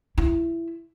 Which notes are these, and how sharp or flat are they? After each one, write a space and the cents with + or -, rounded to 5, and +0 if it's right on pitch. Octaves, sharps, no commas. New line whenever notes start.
E4 +15